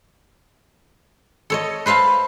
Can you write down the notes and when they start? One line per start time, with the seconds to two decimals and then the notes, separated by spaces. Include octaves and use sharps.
1.50 A4 C#5 D#5
1.86 B4 C5 E5 F5 A5